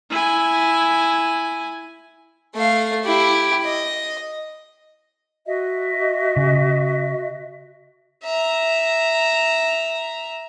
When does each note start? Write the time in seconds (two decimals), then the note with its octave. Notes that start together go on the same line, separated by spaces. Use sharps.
0.10 E4 G#5
2.54 A3 F5
3.04 E4 G4
3.65 D#5
5.46 F#4 D#5 E5
6.36 C#3
8.24 E5 A#5